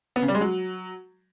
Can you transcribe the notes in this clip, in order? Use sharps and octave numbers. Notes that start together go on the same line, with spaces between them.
B3
C#3
G3
G#3
F#3